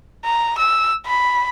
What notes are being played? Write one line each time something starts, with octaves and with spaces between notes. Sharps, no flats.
A#5
E6
B5